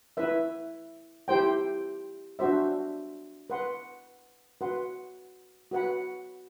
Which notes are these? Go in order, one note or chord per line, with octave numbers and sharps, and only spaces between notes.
E4 B4 E5
E4 G4 C5 G5
D4 F#4 C5 E5
B4 F#5 C6
F#4 B4 F#5 C6
F#4 B4 F#5 B5